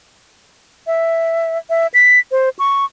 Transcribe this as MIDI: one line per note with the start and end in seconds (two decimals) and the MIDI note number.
0.87 1.58 76
1.70 1.87 76
1.94 2.20 95
2.31 2.49 72
2.59 2.85 85